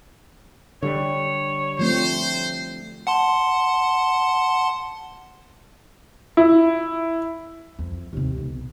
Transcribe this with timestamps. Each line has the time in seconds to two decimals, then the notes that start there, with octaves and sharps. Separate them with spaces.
0.83 D3 G3 C#5
1.79 F3 A3 C4 C5
3.07 F#5 A5 C6
6.37 E4
7.79 F2
8.13 D#2 C3
8.38 B1